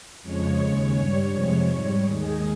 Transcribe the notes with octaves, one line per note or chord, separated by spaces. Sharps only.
F2 C#3 F3 G#3 C#5
D#2 C#3 G#3 C#5
G2 G3
F2 C3 F3 G#3
G#2 G3
D#2 D#3 G#3 G#4